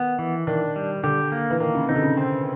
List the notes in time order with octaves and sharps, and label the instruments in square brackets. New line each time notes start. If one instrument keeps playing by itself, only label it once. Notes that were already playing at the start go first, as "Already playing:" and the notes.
Already playing: [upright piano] D#3 [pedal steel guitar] B3
[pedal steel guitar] E3
[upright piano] D#3 [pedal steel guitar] D4
[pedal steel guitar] G3
[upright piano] D3 [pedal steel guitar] G4
[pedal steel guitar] A#3
[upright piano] E3
[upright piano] D#3 [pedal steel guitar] A#3
[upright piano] C#3
[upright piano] C3 [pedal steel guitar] D#4
[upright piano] D3
C#3
[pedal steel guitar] C4